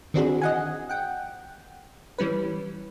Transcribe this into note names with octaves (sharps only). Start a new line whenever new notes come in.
D#3 E3 C4 D4 F#4 G#4
D#5 F#5 G#5
F#5 G5
E3 G3 C#4 B4